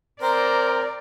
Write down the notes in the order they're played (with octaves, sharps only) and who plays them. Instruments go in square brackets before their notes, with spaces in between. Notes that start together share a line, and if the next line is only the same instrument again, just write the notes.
[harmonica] C4 [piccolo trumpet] A#4 [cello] D5 [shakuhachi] A#5